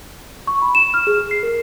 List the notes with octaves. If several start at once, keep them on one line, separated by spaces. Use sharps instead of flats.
C#6
B5
E7
F6
G#4
C7
A#4